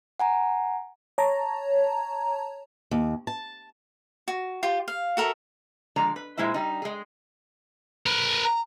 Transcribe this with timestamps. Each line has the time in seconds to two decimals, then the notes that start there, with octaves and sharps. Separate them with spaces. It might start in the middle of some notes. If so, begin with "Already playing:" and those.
0.20 F#5 G#5 A#5
1.18 C#5 A5 A#5
2.91 D#2
3.27 A5
4.28 F#4
4.63 F4 G4
4.88 F5
5.17 F#4 A4 A#4 E5
5.96 D3 F3 G#3 D5 A#5
6.16 B4
6.37 A#2 G#3 E4 C5 E5
6.54 G3 D#4
6.82 G#3 G#4
8.06 A#4 B4
8.44 A#5